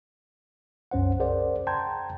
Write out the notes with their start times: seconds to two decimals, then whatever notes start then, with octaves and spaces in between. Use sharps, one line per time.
0.91 C2 F#2 C#4 C5 F#5
1.20 G#4 A#4 C5 D5 F#5
1.67 G5 A5 A#5 C6 G6 G#6